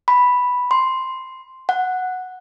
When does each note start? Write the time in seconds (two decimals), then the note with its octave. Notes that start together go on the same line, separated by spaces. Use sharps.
0.08 B5
0.71 C6
1.69 F#5